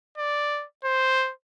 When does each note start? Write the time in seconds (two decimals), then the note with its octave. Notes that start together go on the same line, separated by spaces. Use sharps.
0.18 D5
0.85 C5